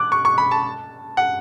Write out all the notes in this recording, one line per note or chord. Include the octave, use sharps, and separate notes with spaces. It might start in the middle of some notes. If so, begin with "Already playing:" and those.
Already playing: D6 F#6
C#6
C#6
B5
A5
F#5